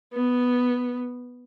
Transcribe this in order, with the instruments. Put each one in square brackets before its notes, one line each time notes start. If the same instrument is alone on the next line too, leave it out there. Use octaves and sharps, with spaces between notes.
[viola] B3